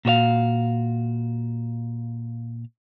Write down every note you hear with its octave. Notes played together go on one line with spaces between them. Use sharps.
A#2 F#4 C#5 F5